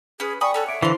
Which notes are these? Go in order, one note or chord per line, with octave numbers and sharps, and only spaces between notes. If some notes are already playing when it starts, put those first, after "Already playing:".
C#4 G#4 B4
D5 G5 G#5 B5 C#6 D#6
C#4 A4 C#5 F#5
E5 D6 D7
D3 E3 E4 C5 F5 C6